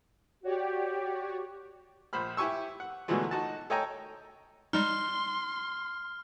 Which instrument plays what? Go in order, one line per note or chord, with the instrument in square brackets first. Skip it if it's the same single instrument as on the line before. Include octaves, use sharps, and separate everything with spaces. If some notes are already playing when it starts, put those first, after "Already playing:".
[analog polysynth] F#4 C#5 D5 [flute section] G4
[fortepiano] A#1 C5 B5 F6
E4 G4 G#5 C#6 E6
F#5
B2 D3 E3 F#3 G#3 A3
D#4 F#4 A5
A4 C#5 D#5 G5 G#5 A#5
[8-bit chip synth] G3 G#3 D#4 [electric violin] C6 [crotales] F6